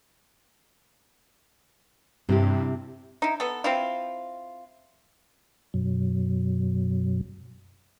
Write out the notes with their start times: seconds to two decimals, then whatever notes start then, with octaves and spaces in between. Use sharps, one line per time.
2.29 G2 C3 E4 G4
3.22 D#4 E4
3.40 B3 A4
3.64 C4 E4 F4
5.74 F#2 B2 F#3